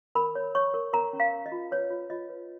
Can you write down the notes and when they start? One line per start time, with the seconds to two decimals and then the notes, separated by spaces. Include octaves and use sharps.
0.15 A#4 B5
0.35 C#5
0.55 C#5 C#6
0.74 A#4
0.93 A#4 A#5
1.13 C#4
1.20 F5
1.33 A#4
1.46 D#5
1.52 F4
1.71 B4 C#5
1.91 F4
2.10 F4 D#5
2.29 B4